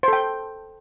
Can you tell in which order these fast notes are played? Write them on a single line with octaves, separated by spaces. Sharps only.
C5 A4 G5